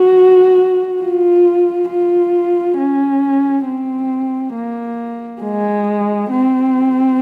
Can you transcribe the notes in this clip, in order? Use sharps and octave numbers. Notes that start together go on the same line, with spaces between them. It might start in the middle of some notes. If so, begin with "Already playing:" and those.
Already playing: F#4
F4
F4
C#4
C4
A#3
G#3
C4